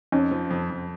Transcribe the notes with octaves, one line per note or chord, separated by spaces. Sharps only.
F2 C#4 D#4
F3
F2
F2